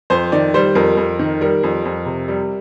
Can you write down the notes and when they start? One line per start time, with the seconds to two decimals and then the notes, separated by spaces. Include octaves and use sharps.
0.10 F2 C5
0.32 D#3 D5
0.54 G3 C5
0.75 F2 A#4
0.97 F2
1.19 D#3
1.41 G3 A#4
1.63 F2
1.85 F2
2.06 C3
2.28 G3